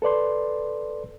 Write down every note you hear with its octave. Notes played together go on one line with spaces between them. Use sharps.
A4 B4 D5 C6